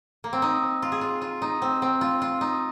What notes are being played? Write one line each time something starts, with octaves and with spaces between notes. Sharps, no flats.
A#3
C4
D#4
F4
G#4
F4
F4
D#4
C4
C4
F4
F4
D#4